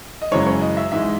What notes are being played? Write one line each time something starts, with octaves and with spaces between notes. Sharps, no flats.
D#5
F#2 C#3 E3 G#3 C#5
C#5
D#5
E5
G#2 E3 G#3 E5